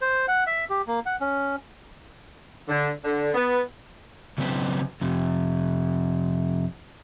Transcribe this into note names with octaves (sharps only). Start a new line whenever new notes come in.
C5
F#5
E5
G4
A#3
F#5
C#4
D3
D3
B3
C#3 F#3 C4 B4 C5
F2 C3